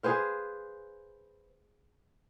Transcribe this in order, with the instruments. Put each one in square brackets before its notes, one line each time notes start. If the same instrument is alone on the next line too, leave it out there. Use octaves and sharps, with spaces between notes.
[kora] G#4 B4 C5 F5